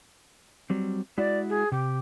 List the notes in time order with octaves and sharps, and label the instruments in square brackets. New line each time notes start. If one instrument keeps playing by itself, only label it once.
[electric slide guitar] F#3 G3 C4
[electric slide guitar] G#3 E4 F#4 [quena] D5
[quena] G#4
[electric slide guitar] C3 [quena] G4